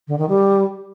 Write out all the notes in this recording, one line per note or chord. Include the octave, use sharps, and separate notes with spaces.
D3
D#3
G3